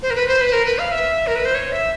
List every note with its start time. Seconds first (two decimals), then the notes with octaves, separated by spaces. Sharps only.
0.02 C5
0.10 A#4
0.15 B4
0.28 C5
0.41 B4
0.53 A#4
0.65 B4
0.79 F5
0.92 E5
1.27 A#4
1.36 B4
1.45 C5
1.55 C#5
1.72 E5